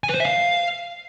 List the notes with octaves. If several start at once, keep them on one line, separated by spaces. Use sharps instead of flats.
G#5
B4
C5
E5
F5